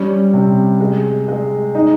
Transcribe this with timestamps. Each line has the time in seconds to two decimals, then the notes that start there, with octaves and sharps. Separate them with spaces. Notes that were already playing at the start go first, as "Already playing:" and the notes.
Already playing: G3 C#4
0.33 C3
0.80 G#3
1.28 G#3
1.75 D#4